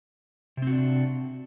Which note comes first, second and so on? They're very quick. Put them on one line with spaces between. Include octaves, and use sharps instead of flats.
C3 C4 F#4 D4